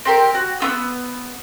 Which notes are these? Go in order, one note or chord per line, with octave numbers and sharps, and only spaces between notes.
C4 G4 A#4
F#4
B3 F4 E6